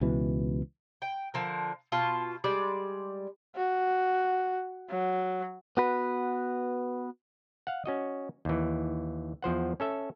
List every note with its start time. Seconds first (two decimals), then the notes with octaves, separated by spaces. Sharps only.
0.01 C#2 B2 E3
1.02 G5
1.34 D3 F3 A#4
1.92 B2 F4 A5
2.44 G3 G#3 D5
3.56 F#4
4.90 F#3
5.77 B3 F#4 B4
7.67 F5 F#5
7.86 C#4 F#4 D#5
8.45 D#2 E3
9.42 E2 F3 C5 F#5
9.80 C#4 A4 E5